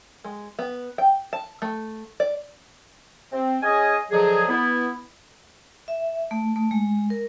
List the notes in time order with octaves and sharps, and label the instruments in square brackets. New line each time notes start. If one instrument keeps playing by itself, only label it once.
[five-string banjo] G#3
B3
G5
A5
A3
D5
[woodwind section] C4
C#4 G#4 D#5 G#5
D3 D#3 F3 F#3 G#4
B3 E4
[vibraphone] E5
A3
A3
G#3
A#4